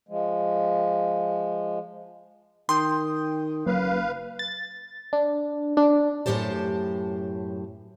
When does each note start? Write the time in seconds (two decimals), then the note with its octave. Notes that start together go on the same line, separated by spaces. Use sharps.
0.09 F3 G#3
2.69 D#3 G5 C6 D#6 G6
3.66 F#1 F#3 A#3 B4 F5
4.39 A6
5.13 D4
5.77 D4
6.26 F#2 A2 D#3 G4 C5 A5